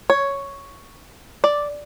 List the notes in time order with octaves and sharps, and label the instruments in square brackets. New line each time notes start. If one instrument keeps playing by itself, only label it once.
[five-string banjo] C#5
D5